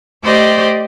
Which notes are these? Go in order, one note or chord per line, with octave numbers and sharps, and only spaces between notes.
A3 G4 C5 D5 D#5